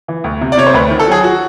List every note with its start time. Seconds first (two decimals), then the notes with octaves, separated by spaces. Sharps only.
0.08 E3
0.24 D2
0.41 C3
0.52 D5
0.57 C3 C#5
0.66 C5
0.74 D2 B4
0.90 D#3
1.00 A4
1.07 F#3 G#4
1.24 F#4